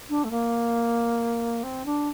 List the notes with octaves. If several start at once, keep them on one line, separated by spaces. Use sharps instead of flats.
D4
A3
A#3
C4
D4